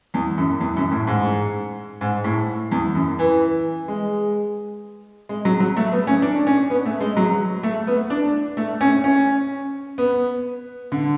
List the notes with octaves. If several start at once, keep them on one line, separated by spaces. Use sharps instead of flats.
E2
F#2
E2
F#2
A2
G#2
G#2
A2
E2
F#2
E3
G#3
G#3
F#3
F#3
A3
B3
C#4
D4
C#4
B3
A3
G#3
F#3
A3
B3
D4
A3
C#4
C#4
B3
D3